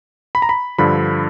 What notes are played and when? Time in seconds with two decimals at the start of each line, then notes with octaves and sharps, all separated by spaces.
0.35 B5
0.42 A#5
0.49 B5
0.78 G2 D3 F3 B5